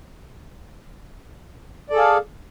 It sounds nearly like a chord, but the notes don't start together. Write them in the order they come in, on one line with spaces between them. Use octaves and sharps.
D5 A4 G#4 F5